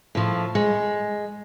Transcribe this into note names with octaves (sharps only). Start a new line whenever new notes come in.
A2 F3
G#3